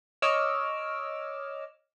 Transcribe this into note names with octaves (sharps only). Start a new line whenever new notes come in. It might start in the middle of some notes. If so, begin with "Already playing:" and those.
C#5 D#5 D6 E6 F6